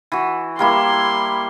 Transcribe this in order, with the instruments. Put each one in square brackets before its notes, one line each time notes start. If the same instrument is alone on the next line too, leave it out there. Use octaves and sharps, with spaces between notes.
[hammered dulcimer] E3 F#4
[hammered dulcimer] G3 A#3 E4 [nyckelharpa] C6